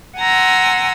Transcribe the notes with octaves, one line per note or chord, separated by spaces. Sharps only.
F#5 G#5 A#5 C6 E6